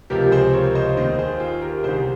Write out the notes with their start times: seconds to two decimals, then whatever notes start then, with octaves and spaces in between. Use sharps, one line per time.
0.10 C#2 C3 F3 G4 A#4
0.32 G#4 C5
0.53 A#4 C#5
0.75 C5 D#5
0.97 D#2 D#3 C5 D#5
1.19 G#4 C5
1.40 F4 G#4
1.62 G4 A#4
1.83 C2 C3 D#3 G#4 C5
1.94 C5